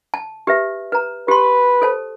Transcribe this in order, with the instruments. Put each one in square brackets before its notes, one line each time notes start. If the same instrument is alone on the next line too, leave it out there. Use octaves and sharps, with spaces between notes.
[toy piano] A5
G4 B4 E5
B4 A#5
[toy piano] G4 C6 [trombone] B4
[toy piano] A4 C5 A5